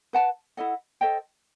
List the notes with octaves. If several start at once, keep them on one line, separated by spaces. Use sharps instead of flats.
B4 F#5 A5
E4 A4 D#5 F#5
A4 C5 D#5 G5